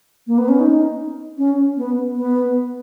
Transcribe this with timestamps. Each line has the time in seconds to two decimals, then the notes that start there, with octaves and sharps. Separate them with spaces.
0.27 A#3
0.38 B3
0.49 C#4
0.59 D#4
1.38 C#4
1.77 B3
2.16 B3